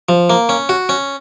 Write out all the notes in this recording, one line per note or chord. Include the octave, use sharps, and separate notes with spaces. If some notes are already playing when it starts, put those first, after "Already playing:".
F3
A#3
C#4
F#4
C#4